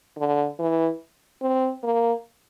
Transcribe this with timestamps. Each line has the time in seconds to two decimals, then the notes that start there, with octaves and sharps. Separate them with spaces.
0.17 D3
0.59 E3
1.42 C4
1.84 A#3